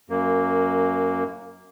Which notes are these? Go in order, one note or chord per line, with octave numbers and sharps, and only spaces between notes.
F#2 A#3